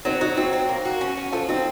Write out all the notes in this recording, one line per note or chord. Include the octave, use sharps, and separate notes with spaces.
F#3 C4 D#4
F#3 D#4 F#4
C4 D#4 F#4
C4
A#3
F#4
C#4
C#4
F3 F4 A4
C4 D#4 F#4